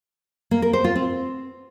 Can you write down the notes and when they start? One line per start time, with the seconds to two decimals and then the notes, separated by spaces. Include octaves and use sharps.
0.51 A#3
0.62 A#4
0.73 C5
0.84 F4
0.96 C4